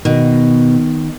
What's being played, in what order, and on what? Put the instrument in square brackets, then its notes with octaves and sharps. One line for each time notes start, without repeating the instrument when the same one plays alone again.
[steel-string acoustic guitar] B2 [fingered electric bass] D#3